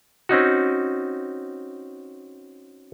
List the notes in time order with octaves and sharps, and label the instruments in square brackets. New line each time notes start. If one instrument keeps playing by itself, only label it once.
[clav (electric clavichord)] C4 C#4 D#4 F#4